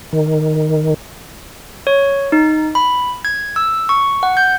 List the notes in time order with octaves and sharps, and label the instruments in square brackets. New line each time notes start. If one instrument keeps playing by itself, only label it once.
[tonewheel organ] D#3
[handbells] C#5
D#4
B5
G#6
E6
C#6
F#5
G6